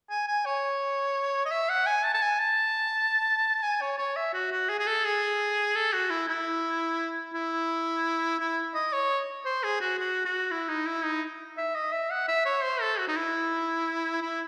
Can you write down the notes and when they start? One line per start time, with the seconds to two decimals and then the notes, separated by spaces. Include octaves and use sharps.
0.10 G#5
0.27 G#5
0.45 C#5
1.45 D#5
1.51 E5
1.69 F#5
1.86 G#5
2.04 A5
2.14 A5
2.22 G#5
2.39 A5
3.63 G#5
3.81 C#5
3.98 C#5
4.16 E5
4.34 F#4
4.52 F#4
4.69 G#4
4.79 G#4
4.87 A4
5.05 G#4
5.75 A4
5.93 F#4
6.10 E4
6.28 E4
7.34 E4
8.40 E4
8.75 D#5
8.93 C#5
9.46 C5
9.63 G#4
9.81 F#4
9.99 F#4
10.25 F#4
10.52 E4
10.69 D#4
10.87 E4
11.05 D#4
11.57 E5
11.75 D#5
11.93 E5
12.11 F#5
12.28 E5
12.46 C#5
12.63 C5
12.81 A4
12.99 F#4
13.08 D#4
13.17 E4
14.22 E4